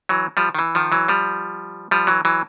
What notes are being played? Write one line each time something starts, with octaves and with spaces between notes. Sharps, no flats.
E3 F#3
F3 G3
D#3
E3
D#3 F3
E3 F#3
F3 G3
F3 G3
E3 F#3
E3 F#3